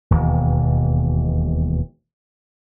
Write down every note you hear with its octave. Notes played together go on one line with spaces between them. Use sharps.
E1 D#2 B2 E3